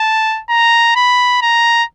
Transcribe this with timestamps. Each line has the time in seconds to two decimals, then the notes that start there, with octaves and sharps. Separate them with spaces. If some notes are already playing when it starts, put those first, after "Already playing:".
Already playing: A5
0.50 A#5
0.96 B5
1.42 A#5